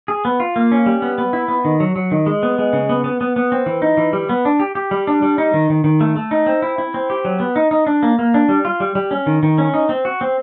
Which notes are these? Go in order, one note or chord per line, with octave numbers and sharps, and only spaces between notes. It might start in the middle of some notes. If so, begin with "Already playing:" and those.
G#4
B3
F4
A#3
C#4
G3
B3
B3
E4
B3
D#3
F#3
F#3
D#3
G#3
B3
G#3
C#3
B3
B3
B3
B3
C4
E3
D#4
E3
G3
B3
D4
G4
G4
G3
D4
G3
D#4
D#3
D#3
D#3
A3
A3
D#4
C4
E4
E4
C4
G4
F#3
B3
D#4
D#4
D4
A#3
A#3
D4
G3
F4
G3
G3
C#4
D#3
D#3
C#4
D#4
C4
F#4
C4